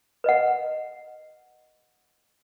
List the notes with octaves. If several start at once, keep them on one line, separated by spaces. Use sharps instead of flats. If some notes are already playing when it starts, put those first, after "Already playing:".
B4 D#5 F#5